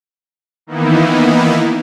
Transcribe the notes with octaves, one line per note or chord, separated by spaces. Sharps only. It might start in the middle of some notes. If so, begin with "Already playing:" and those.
D#3 E3 A#3 B3 D#4 E4